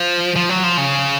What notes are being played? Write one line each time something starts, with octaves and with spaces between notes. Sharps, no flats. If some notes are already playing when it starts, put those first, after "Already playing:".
Already playing: F3
F3
F#3
F3
C#3